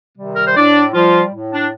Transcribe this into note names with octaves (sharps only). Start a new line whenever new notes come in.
C3 D#3 G3
A#4
C5
A2 D4 D5
F3 G3 F4
A2
D4